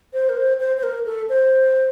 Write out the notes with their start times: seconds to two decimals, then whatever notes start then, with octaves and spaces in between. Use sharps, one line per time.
0.13 C5
0.29 A#4
0.37 C5
0.60 C5
0.77 C5
0.83 A#4
1.06 A4
1.29 C5